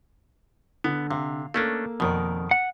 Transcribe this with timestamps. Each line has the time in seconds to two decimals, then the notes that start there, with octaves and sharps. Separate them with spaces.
0.84 D3 B3
1.11 C3 F5
1.54 A3 A#3 C#4 D4 A4
2.00 F2 B2 D#3 A#4 D5
2.51 F#5